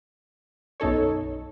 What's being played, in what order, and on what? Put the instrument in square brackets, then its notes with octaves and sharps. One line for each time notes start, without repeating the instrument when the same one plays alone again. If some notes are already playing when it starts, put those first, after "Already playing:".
[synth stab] B1 F#2 D#4 A4 C#5